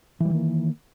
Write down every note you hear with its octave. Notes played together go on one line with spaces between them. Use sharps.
D#3 E3 G3 A#3